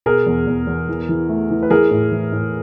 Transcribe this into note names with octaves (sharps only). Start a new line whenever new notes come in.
B2 G#4 A#4
E2
E2
E2
E3
E3
A3
E3
B4
E3 G#4 A#4
A2
E3
A2